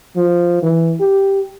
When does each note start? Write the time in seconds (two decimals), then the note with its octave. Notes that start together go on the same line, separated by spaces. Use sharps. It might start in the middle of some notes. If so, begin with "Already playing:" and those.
0.16 F3
0.62 E3
0.99 G4